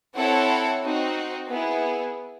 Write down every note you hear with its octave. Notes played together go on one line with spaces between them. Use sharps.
C4 E4 A4 C#5 F#5
C4 D#4 F#4
B3 E4 G#4